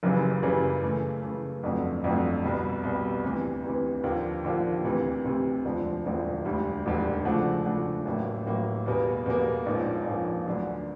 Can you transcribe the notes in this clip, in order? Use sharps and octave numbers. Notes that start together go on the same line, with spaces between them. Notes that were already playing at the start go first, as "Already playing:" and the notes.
F#1 F#2 C#3 E3 G3
F#1 F#2 C#3 E3 G3
C#3 E3 A3
C#3 E3 A3
G1 F2 D3 F#3 A3
G1 F2 D3 F#3 A3
C2 B2 G3
C2 B2 G3
D2 C3 E3
D2 C3 E3
D#2 D3 F3 A#3
D#2 D3 F3 A#3
D2 C3 E3
D2 C3 E3
E1 D2 D3 F3
E1 D2 D3 F3
E1 D2 D3 G3
E1 D2 D3 G3
C#3 F3 A3 D4 F#4
C#3 F3 A3 D4 F#4
A1 A2 F#3 A#3
A1 A2 F#3 A#3
E2 B2 G3 A#3
E2 B2 G3 A#3
A#1 G#2 F3 A#3 C#4
A#1 G#2 F3 A#3 C#4
D2 D3 F#3